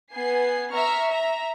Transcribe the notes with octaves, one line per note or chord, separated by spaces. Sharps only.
B3 G#5 C7
E5 A#5 C#6 F6
E5 A#5